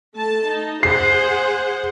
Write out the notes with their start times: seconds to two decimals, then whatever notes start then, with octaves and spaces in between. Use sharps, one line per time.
0.16 A3 A5
0.46 D#4
0.83 G#4 C5 F#5 C7